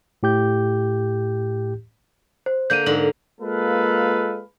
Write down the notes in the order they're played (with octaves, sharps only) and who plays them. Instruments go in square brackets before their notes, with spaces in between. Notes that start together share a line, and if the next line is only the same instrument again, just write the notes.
[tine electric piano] A2 G4 G6
[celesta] C5
[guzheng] D3 A#3 [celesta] G6 D#7
[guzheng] G#2 D3 [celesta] A#4 F#7
[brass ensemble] G#3 A#3 F4 A4 B4 F5